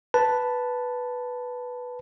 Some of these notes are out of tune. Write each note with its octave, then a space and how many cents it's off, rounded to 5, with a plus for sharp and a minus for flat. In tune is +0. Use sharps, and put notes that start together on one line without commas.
B4 +0 A5 +0